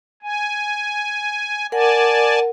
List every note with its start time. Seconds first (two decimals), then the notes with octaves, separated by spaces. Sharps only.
0.23 G#5
1.72 A#4 D5 F#5 G#5 A5